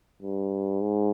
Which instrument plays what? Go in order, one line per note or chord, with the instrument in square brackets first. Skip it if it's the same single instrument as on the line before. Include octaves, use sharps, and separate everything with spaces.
[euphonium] G2
G#2